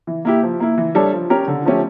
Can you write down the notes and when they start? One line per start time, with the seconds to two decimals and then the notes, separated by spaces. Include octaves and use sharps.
0.07 E3
0.25 A#3 E4 G4
0.43 F3
0.60 A#3 E4
0.78 E3
0.95 G3 D4 A4 C#5
1.13 F3
1.30 C#4 G4 A#4 C#5
1.48 D3
1.66 F3 A3 C#4 G4